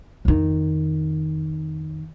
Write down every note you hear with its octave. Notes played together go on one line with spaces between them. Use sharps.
F2 D#3